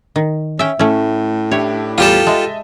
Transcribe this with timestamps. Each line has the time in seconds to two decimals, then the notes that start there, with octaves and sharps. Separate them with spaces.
0.16 D#3
0.59 C#4 E5 G5
0.79 A2 A3 C#4
1.51 D4 E4 G4 C#5
1.98 E2 G3 F4 G4 A4
2.27 G#3 D#5 E5 A5